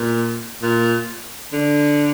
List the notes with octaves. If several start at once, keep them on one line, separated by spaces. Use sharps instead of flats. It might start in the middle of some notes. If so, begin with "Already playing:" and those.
Already playing: A#2
A#2
D3